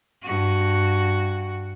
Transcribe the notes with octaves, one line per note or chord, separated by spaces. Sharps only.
G2 F#4